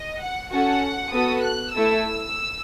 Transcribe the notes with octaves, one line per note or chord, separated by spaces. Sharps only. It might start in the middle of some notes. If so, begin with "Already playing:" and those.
Already playing: D#5
F#5
C#4 F#4 A4 F#5
B3 F#4 A4 D#6
F#6
A3 E4 A4 E6